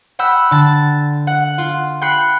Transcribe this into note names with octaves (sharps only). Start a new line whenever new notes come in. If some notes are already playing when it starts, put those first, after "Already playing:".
F#5 G5 B5 E6 F6
D3 A5 A6
F#5
F4
G5 B5 F#6 G6 C7 C#7